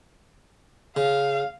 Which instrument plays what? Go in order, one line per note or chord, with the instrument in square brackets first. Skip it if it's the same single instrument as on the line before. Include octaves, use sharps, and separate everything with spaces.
[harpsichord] C#3 [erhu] F5